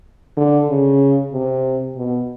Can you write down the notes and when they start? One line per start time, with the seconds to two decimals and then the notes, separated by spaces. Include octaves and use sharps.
0.37 D3
0.70 C#3
1.32 C3
1.97 B2